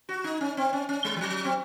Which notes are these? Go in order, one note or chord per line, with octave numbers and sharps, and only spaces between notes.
F#4
D#4
C#4
C4
C#4
C#4
G#3
F3
F#3
C4